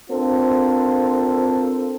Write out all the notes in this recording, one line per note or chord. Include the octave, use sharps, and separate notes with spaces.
C4 D4 F4 A4 A#4 C5